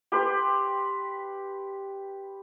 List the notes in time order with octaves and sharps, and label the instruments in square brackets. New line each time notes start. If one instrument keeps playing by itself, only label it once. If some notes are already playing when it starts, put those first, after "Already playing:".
[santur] G4 B4 C6